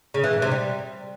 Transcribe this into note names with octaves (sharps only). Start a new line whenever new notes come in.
C#3
E3
G#2
C3
G3